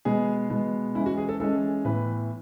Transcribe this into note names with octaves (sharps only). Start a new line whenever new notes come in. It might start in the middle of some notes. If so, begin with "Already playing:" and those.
B2 G#3 B3 G#4
B2 G#3 B3
E3 G#3 C#4 E4
F#4
G#4
A4
E3 G#3 C#4 A4
A2 E3 B3 B4